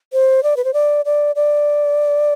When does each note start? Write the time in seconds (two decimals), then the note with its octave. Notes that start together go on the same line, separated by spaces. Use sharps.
0.13 C5
0.43 D5
0.57 B4
0.65 C5
0.74 D5
1.05 D5
1.36 D5